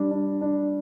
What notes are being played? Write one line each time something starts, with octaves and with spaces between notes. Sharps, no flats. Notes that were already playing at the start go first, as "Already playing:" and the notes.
Already playing: G3 D4
D4
D4